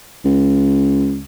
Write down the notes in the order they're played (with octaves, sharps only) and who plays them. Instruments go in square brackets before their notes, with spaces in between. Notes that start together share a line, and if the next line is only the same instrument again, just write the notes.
[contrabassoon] C#2